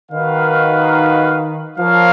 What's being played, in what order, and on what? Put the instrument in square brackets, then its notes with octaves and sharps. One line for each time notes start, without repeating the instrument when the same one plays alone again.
[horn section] D#3 [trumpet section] F#4 B4 F5
[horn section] F3 [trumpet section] F4 A#4 C#5 F5